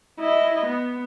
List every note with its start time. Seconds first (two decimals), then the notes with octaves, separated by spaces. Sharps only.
0.19 E4 D#5
0.66 B3